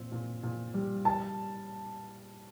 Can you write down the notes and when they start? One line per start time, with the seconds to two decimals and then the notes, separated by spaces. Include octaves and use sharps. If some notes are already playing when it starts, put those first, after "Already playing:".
Already playing: A#2 C4
0.12 A#2
0.43 A#2
0.74 G3
1.05 A5